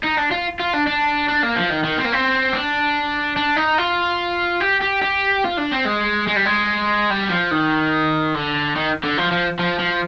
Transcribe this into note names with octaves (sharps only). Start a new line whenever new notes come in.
D#4
D4
F4
F4
D4
D4
D4
A#3
F3
D#3
D#3
C4
A#3
C4
D4
D4
D#4
F4
G4
G4
G4
F4
D4
C4
G#3
G#3
G3
G#3
G3
F3
D#3
D3
D#3
D3
F3
F3
F3
F3